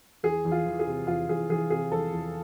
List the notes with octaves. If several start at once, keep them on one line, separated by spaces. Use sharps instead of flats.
E2 G#4
E2
F4
E3
G#4
C3
E2 F4
E2 G#4
E3 G#4
C3 G#4
E2 A4
E2